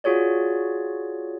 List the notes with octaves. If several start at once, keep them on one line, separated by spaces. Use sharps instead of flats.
F4 F#4 G#4 C#5 D5